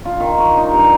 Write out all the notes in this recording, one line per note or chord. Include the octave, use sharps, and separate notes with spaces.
F4
D#3
C#6
D#4
G2